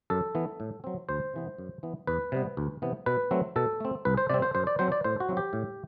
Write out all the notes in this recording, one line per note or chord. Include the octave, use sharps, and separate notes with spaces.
F#2 A4
E3 B3
A2
F#3 C4
D2 C5
C3 E3 B3
F#2
E3 B3
E2 B4
C3 G3 B3
D2
C3 E3 B3
B2 B4
F#3 A3 C4
B2 A4
A3 C4
C2 B4
C5
C3 G3 C4 D5
C5
F#2 C5
D5
F#3 C4 C5
D5
A2 C5
F#4
F#3 C4
G4
A2